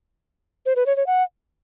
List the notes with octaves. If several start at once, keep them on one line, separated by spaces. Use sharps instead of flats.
C5
B4
C#5
C#5
F#5